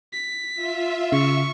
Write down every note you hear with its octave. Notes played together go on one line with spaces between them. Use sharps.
B6
F4 E5
C#3 C#6